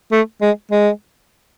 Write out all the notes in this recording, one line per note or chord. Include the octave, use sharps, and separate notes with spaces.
A3
G#3
G#3